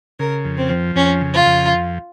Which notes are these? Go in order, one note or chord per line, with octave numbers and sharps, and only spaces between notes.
C#3 A#4
F2
C4
F3
F2 C#4
C#3
F4
F2